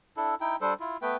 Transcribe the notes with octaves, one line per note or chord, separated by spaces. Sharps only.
D4 E4 A4
D#4 E4 G5
G3 D4 A4 C5
E4 F4
A3 B3 B4 G5